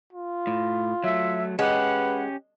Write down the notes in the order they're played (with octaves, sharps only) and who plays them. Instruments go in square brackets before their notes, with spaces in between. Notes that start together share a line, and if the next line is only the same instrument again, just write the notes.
[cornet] F4
[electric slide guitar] A2
[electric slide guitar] F#3 A3 [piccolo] E5
[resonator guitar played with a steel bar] G#3 [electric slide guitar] C#4 G4 [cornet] B4 [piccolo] F#5